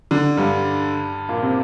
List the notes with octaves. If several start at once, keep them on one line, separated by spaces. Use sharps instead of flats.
D3
G2 G3
A#2 A#3
C3 C4